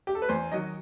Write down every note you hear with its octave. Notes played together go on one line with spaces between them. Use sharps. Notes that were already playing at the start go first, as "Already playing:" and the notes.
G4
A4
B4
E2 C5
D#3 F#3 D#5